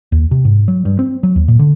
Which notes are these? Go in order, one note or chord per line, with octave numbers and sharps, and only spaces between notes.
D#2
C3
G#2
F#3
G2
C4
F#3
D#2
A#2
D3